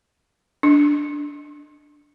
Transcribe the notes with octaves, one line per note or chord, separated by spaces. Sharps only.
D4